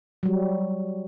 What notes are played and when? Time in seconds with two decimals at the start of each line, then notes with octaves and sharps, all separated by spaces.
0.23 F#3 G3